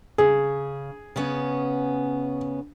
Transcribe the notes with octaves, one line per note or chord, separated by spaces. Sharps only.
C#3 G#4
C#3 B3 C#4